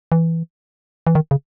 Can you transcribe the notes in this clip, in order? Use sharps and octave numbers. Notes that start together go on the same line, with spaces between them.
E3
E3
D#3
C#3